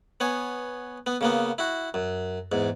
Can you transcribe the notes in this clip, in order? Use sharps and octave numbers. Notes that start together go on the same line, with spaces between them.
B3 C#5 G#5
B3
C#3 A#3 B3
E4 F#4
F#2
E2 G#2